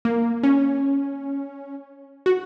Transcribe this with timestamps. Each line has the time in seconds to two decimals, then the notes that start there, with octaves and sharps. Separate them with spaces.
0.05 A#3
0.43 C#4
2.26 F#4